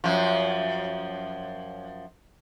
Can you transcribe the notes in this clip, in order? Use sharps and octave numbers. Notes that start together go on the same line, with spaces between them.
F#2 F3